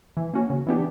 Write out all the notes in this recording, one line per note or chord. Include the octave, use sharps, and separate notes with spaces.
E3
A#3 C#4 F#4
C#3
E3 B3 D4 G4